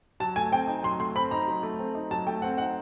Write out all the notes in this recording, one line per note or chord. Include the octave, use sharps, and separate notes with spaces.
F#3 A5
A3 G#5
C4 G5
D#4
F#3 C6
A3 C6
C4 B5
D#4 A#5
F#3
A3
C4
D#4
F#3 A5
A3 G5
C4 F#5
D#4 F#5